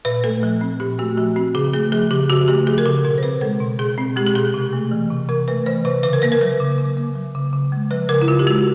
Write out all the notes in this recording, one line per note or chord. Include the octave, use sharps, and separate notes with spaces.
A#2 B4
A3 A4
F3
C4
A#2 G4
A3 F#4
F3 F#4
C4 F#4
C#3 G#4
A3 G#4
F3 G#4
C#3 G4
C#3 F#4
A3 G4
F3 G#4
A#4
C#3 A4
B2 A#4
C5
C4 B4
G#3 A4
B2
B2 G#4
C4
G#3 G4
G4
B2 G#4
C3
A3
E3
C3
C3 A#4
A3 B4
E3 C5
C3 B4
C#3 B4
A#4
A#3 B4
A#4
F#3 B4
C#3
C#3
A#3
F#3
C#3
C#3
G#3
F3 B4
C#3 A#4
E4
C#3 F4
G4
G#3 F#4